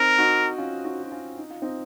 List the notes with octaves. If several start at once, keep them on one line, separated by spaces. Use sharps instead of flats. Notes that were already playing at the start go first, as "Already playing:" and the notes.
Already playing: C4 D#4 A#4
D#4 F#4
C#4 F4
D#4 F#4
F#4
C#4 F4
D#4
F4
C4 D#4